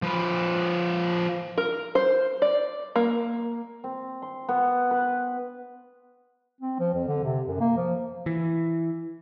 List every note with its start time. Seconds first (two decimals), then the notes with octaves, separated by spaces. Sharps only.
0.02 F3 B4
1.58 A#4
1.95 C5
2.42 D5
2.96 A#3
3.84 C4
4.22 C6
4.49 B3
4.91 B4
6.61 C4
6.80 F3
6.94 F2
7.08 D3
7.24 C3
7.47 F#2
7.60 A#3
7.77 F3
8.26 E3